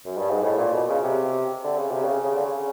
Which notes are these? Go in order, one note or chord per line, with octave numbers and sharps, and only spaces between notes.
F#2
G2
G#2
A2
A#2
B2
C#3
C3
D3
C#3
C3
C#3
C#3
D3
C#3